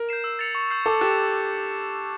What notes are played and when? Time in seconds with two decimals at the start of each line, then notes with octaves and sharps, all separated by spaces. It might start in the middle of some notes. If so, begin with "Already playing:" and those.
Already playing: A#4
0.09 G6 C7 E7
0.24 E6
0.39 A6 C#7 F7
0.55 C#6
0.70 E6 G6 C7
0.86 A4 D6
1.01 G4 F#6 A6 C#7 E7